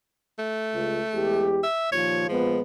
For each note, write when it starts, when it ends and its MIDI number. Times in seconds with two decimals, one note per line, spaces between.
0.39 1.49 57
0.74 0.99 37
1.13 1.62 40
1.13 1.62 56
1.13 1.62 67
1.63 1.91 76
1.92 2.27 39
1.92 2.27 46
1.92 2.27 53
1.92 2.25 73
2.29 2.60 46
2.29 2.60 53
2.29 2.60 56
2.29 2.60 59